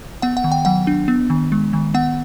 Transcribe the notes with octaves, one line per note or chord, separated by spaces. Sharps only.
B3 F#5
F#5
D#3
G5
F#3 F#5
D4
B3
D#3
G#3
D#3
B3 F#5